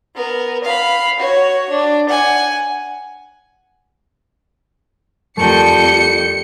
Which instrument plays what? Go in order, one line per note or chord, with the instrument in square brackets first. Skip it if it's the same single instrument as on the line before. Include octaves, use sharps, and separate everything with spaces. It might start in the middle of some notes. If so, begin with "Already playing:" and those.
[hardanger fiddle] B3 A#4
F5 B5
F#4 C#5
D4
F#5 G#5
[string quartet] F2 G3 G6 [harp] A3 A#4 A5 [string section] C#7